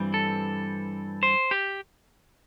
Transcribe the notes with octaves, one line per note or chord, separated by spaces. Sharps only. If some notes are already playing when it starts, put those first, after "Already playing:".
Already playing: G2 E3 G3 C4
A4
C5
G4